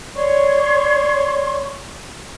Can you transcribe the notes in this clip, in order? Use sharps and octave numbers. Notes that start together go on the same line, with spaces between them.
C#5 D5 C6 C#6